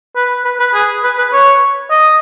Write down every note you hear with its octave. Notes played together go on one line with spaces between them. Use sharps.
B4
B4
B4
G#4
B4
B4
C#5
D#5